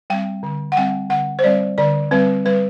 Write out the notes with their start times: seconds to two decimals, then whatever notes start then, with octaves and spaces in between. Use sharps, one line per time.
0.10 G3 C4 G5
0.43 D3
0.72 F#5
0.77 G3 C4 G5
1.10 D3 F#5
1.39 C5
1.44 G3 C4 D5
1.78 D3 D5
2.11 G3 C4 B4
2.45 G3 B4